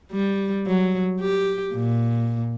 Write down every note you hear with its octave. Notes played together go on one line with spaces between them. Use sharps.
G3
F#3
G4
A#2